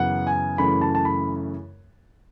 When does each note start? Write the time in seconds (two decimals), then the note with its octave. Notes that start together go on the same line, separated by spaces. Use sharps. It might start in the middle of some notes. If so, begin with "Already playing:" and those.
Already playing: F#2 C#3 E3 B3 F#5
0.27 G#5
0.58 F#2 C#3 E3 A3 B5
0.81 A5
0.95 A5
1.05 B5